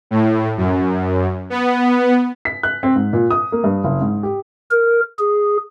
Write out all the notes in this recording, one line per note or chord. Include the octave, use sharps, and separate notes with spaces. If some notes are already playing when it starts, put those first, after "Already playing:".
A2
F#2
B3
B6
F#6
C4
G#2
A#2
D#6
A#3
G2
F#1
G#2
G4
A#4
G#4